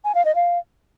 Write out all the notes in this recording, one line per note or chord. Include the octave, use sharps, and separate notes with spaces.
G#5
F5
D#5
F5